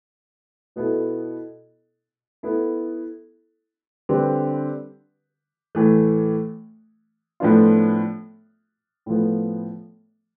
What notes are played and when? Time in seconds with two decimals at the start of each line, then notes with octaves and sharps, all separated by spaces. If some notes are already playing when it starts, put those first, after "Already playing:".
0.76 B2 B3 E4 A4
2.43 B3 E4 A4
4.09 D3 G3 C4 G4 B4
5.75 A2 E3 A3
7.40 A2 F3 B3 D4 F4
9.06 A2 F3 B3